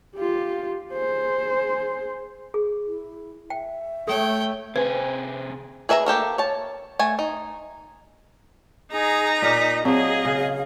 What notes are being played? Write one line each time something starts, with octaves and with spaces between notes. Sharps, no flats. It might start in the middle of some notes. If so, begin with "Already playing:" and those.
F4 G4
G#4 C5
G#4
E4
E5 G5
A3 A4 C#5 G5
C3 C4 G#4 B4 C5 G#5
G#4 B4 E5 A5 A#5
A#3 G4 A4 A#4
C#5 A5
A3 G#5
D#4
D#4 G#4 A#5
A#2 A#4 D5 B6
F#3 C4 G#4 C5 D#5 F5
C#3